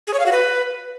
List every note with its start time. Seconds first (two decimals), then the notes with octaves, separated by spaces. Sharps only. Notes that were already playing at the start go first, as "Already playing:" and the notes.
0.07 G#4
0.13 C#5
0.20 F5
0.26 F#4
0.32 B4